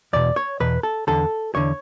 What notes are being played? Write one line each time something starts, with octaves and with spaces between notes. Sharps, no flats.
E2 B2 D5
C#5
E2 B2 B4
A4
E2 D3 A4
E2 D3 C#5